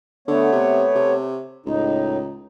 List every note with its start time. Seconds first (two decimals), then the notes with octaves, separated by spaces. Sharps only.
0.28 D3 A3 B3 C#5
0.52 C3
0.95 C3
1.66 C#2 A2 D#4